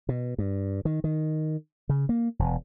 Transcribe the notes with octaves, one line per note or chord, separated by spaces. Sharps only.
B2
G2
D#3
D#3
C#3
A#3
E1